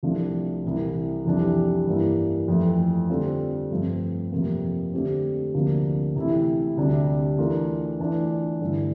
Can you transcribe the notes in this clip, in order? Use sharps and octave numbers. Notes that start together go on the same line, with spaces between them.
C2 C3 F3 A3 D4
C2 C3 E3
F2 C3 E3 G3 D4
G2 E3 G3 A#3 E4
F2 E3 A3
D3 G3 C4 F4 A4
G2 F3 A3 C4
F2 C3 F3 A#3
D3 A3 C4 G4
D2 C3 F3 A#3 D4
C3 E3 A3 E4
D2 C3 G3 D4
E3 A3 D4 F4 A#4
E2 E3 A3 D4 F4
G2 D3 A3 E4